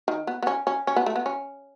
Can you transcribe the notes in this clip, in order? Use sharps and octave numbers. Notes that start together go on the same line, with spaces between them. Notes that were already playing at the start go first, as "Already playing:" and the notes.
D#3
B3
B3
C#4
C#4
C#4
B3
A3
B3
C#4